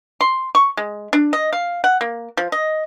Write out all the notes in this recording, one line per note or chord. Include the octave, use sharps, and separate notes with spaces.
C6
C#6
G#3
D4
D#5
F5
F#5
A#3
F3
D#5